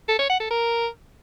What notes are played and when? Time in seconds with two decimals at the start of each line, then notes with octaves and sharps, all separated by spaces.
0.09 A4
0.19 C#5
0.30 F#5
0.40 A4
0.51 A#4